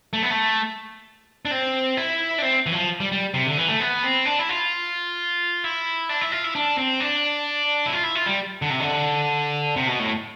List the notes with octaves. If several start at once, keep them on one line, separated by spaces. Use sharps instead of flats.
A3
B3
A3
D4
C4
E4
D4
C4
E3
F3
G3
G3
C3
D3
E3
A3
B3
C4
D4
E4
F4
E4
D4
E4
F4
E4
D4
C4
D4
E4
F4
E4
F4
G3
D3
C3
D3
C3
B2
A2